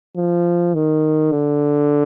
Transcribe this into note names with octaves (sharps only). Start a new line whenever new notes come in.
F3
D#3
D3